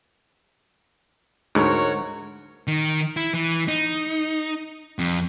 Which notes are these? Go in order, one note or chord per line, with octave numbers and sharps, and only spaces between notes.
D2 G#2 F#4 A#4 C#5
D#3
E4
E3
D#4
F2